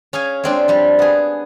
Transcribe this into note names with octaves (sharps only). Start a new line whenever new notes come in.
C#4 G#4 F5 G#5
G#3 C4 D4
F3 G3
B3 G#4